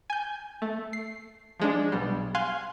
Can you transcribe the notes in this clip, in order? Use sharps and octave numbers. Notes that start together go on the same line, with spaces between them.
G#5 G6
A3
C7
F3 G#3 D4
B1 B2 G3
F5 G#5 C6 F#6